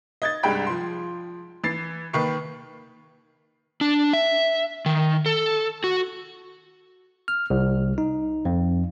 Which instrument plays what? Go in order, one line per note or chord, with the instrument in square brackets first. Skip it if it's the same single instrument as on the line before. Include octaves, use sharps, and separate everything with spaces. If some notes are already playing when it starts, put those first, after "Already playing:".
[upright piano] D#5 G#6 A6
C2 G2 G#3 G5 B5
F3 C6
E3 A6 C7
D#2 D#3 B4 C#6 C7
[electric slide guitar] D4
E5
D#3
A4
F#4
[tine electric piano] F6
C2
D#4
F2